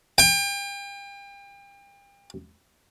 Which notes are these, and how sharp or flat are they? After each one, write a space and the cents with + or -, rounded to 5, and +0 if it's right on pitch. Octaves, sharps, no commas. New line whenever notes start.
G5 +35